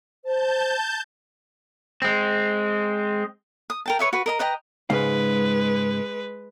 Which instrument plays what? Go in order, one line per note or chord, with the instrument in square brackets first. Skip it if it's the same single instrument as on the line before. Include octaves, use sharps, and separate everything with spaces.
[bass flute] C5 [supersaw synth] A5 G6
[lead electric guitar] G#3 C4
[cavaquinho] D#6
A#4 G5 A5
B4 C#5 D#5 E5
F#4 B4
A#4 D#5 A#5
B4 D#5 G5 A#5
[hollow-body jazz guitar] G#2 C#3 F5 [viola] G#3 B4